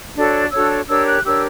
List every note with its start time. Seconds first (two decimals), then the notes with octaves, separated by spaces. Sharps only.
0.15 D4 F#4 A4 C#5
0.51 D4 F#4 A4 C#5 E6
0.88 D4 G4 A#4 C#5 E6
1.06 F#6
1.24 D4 G4 A#4 C#5 E6